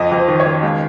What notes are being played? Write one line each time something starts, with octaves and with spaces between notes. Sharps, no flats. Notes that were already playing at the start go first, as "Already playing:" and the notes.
Already playing: F2 D#5
F2 C5
D#3
C#5
D#3
C#2